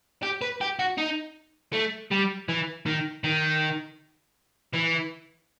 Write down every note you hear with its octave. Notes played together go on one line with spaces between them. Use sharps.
G4
B4
G4
F#4
D#4
A3
G3
E3
D#3
D#3
E3